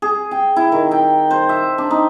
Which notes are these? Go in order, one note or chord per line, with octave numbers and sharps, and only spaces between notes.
G#4
G5
E4
D#3
G5
C5
E5
D4
D#4